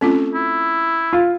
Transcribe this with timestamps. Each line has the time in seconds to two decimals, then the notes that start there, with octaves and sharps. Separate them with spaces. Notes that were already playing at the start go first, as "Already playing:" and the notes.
0.01 A3 C4 C#4 F4
0.34 E4
1.13 F4